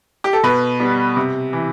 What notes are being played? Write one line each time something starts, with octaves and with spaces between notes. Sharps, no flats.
G4
A4
B2 B4
G3 B3
C3
E3